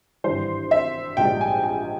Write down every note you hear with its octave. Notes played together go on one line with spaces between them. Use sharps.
G#1 G2 E3 G3 C5
E5
A#1 G#2 G3 G5
G#5
G#5